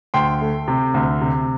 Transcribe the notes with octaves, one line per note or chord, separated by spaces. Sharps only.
D2 G5 C6
A3
C3
D2
C3